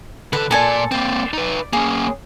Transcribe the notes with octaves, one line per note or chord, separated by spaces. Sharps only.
D3 A4 B4
A#2 A4 D5 G#5 A5
A#3 C4 D5
D#4 B4
A#3 C#4 G#4